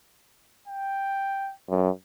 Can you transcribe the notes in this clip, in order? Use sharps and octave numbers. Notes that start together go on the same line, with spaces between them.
G5
F#2